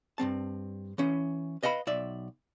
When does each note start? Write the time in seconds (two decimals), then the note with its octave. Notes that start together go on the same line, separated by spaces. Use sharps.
0.18 G2 F3 C4 A5
0.98 E3 C#4
1.63 B4 D#5 F5 G#5 B5
1.87 B1 D5 E5